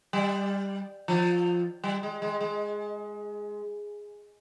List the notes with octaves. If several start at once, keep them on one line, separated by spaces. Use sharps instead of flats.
G3
F3
G3
G#3
G#3
G#3